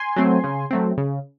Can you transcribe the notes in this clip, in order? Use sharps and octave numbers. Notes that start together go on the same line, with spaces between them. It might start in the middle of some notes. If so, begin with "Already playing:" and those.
Already playing: G#5 C6
F#3 A3 C4
C#3
F#3 A3 C4
C#3